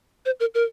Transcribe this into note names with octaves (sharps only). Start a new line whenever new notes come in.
C5
A#4
A#4